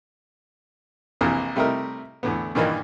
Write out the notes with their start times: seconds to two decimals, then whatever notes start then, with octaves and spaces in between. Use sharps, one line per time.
1.21 A#1 C3 E3 A#3 A#4 G#5
1.56 C3 G3 A3 D#4 E4 A#4
2.23 E2 A2 D3 B3
2.55 G2 A#2 D#3 E3 A#3 D#4